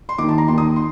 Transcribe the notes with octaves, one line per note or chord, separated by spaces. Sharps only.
C6
D#2 D#3 D6
A5
A#5
D#2 D#3 C6
D#6
C6